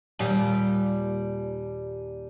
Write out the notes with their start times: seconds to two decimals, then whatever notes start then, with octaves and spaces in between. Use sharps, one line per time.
0.19 D#2 A#2 G3